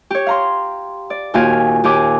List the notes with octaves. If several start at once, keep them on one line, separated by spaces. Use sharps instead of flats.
G4 C#5
F5 A#5 C6
D5
D#2 A#2 F#4 G4 F5 G#5
D#2 G4 G#5 D6